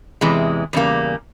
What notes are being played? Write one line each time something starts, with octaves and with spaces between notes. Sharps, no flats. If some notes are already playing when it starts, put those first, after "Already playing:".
E2 C3 E3 G#3
E2 C#3 G3 A#3